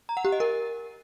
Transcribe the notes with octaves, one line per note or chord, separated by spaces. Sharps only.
A#5
F#5
G4
D#5
A#4